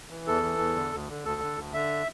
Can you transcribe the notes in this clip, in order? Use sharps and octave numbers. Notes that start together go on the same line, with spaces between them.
E3
E2 A4
E3
E2
D3
D2
D3
D2 A4
D3
D2
D3 E5